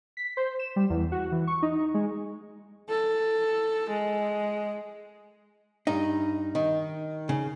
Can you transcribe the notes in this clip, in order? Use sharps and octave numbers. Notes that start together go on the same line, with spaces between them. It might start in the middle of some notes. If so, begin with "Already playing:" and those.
B6
C5
E7
G3
E2
F#4
E3
C#6
D#4
G#3
A4
G#3
G2 D#4
D#3
C#3